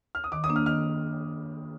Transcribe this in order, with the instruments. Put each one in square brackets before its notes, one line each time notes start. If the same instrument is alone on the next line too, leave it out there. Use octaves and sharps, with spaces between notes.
[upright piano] F6
D#6
[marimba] D#3 [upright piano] D6
[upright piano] D#6
[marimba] A#3 D4
[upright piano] F6
[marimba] D#3 [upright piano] F6